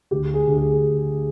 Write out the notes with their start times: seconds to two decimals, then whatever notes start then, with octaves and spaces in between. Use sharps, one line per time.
0.11 D2 G4
0.34 G#4
0.46 D2
0.57 G#4